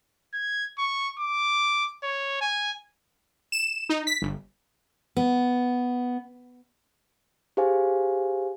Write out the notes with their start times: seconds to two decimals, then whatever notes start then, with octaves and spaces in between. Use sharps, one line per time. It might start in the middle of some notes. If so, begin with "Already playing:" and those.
0.34 G#6
0.79 C#6
1.20 D6
2.03 C#5
2.41 G#5
3.52 E7
3.89 D#4
4.07 B6
4.22 G1
5.17 B3
7.57 G4 G#4 C5 F5 G#5